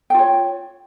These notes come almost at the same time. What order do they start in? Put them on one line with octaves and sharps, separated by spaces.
G5 F4 C#5